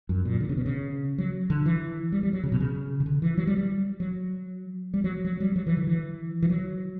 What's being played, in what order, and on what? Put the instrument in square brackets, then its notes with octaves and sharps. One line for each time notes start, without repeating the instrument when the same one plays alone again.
[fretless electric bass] F#2
A#2
D3
C#3
B2
C#3
F#3
D3
E3
G3
G3
F#3
C#3
B2
C#3
C#3
D3
E3
F#3
G3
G3
F#3
G3
F#3
F#3
G3
F#3
E3
D3
E3
E3
F#3